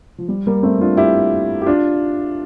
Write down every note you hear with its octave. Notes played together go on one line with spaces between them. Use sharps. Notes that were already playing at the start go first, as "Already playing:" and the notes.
F3
G3
G3 A#3
A3 C4
D4 F4
E4 G4
G4
D4 F4